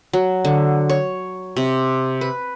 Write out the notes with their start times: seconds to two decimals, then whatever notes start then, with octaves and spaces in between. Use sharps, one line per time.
0.13 F#3
0.45 D3
0.90 C#5
1.57 C3
2.21 B4